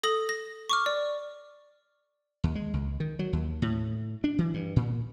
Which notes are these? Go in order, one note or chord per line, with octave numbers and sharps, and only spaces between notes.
A4 D#6 A#6 F#7
A#6
C#6 D6 F6
D5
D#2
G#3
C#2
D#3
F#3
D#2
A2
D4
E3
G2
A#2